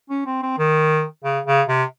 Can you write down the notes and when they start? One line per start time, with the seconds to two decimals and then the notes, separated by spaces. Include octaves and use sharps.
0.10 C#4
0.26 C4
0.43 C4
0.58 D#3
1.24 C#3
1.47 C#3
1.68 C3